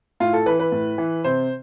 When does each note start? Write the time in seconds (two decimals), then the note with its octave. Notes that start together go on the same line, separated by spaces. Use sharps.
0.20 A2 F4
0.33 A4
0.46 E3 B4
0.60 B4
0.72 A2
0.98 E3
1.24 C3 C5